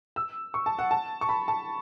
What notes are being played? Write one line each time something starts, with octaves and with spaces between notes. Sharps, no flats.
E6
C#6
A5
F#5
A5
C#6
B5
A5